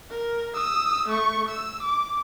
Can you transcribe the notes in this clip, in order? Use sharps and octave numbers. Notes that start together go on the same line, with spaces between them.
A#4
D#6 E6
A3 C#6
E6
D6